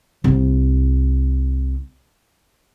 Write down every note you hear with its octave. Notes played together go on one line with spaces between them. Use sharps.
C2 E4